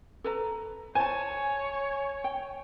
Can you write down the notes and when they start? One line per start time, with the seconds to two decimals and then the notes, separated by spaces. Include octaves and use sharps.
0.24 A4 B4 A#5
0.95 C5 C#5 G#5 A5
2.24 G5